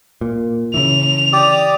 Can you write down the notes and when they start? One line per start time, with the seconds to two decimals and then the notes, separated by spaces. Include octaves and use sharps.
0.21 A#2
0.74 C#3 E3 F7
1.33 G4 D5 D#6